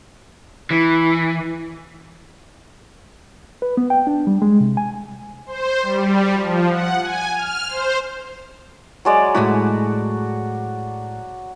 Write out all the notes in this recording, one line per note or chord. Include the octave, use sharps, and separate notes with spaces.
E3
B4
B3
G5
D4
G3
G#3
C3
G#5
C5
G3
F3
F#5
G#5
F6
C5
F#3 G#3 D5
A2 G#3 E4 F#4